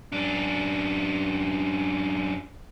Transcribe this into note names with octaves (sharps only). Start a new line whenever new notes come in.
F#2 D4